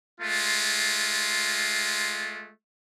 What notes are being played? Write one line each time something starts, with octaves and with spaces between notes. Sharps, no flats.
G#3 A3 F4